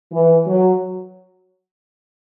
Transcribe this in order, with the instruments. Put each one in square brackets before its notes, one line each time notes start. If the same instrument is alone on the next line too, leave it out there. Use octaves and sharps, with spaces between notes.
[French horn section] E3
F#3